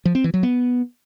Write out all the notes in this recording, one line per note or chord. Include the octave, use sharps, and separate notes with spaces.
F3
C4
E3
F#3
B3